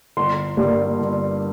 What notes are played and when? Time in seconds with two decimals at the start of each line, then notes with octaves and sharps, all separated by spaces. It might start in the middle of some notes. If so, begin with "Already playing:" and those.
0.17 G1 C6
0.57 G2 G3 A#3
0.99 G1